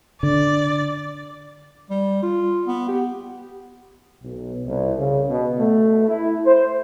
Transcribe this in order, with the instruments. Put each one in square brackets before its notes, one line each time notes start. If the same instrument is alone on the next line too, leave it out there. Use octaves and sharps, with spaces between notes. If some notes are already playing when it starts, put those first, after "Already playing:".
[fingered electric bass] D3 [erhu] D5
[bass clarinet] G3
F4
B3
G4
[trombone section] B1
C2
C#3
B2
A3
E4
C5